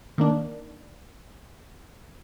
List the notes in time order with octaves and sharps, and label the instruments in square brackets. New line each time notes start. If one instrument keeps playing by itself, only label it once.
[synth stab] D#3 A#3 D4